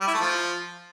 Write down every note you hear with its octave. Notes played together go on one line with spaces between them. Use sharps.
G3
E4
A3
F3